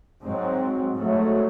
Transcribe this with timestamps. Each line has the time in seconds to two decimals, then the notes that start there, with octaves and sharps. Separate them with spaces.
0.22 G#2 F#3 C4
0.94 G#2 F#3 A3